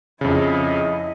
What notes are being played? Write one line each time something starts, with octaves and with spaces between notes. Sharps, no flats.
F2 C#3 E4 D#5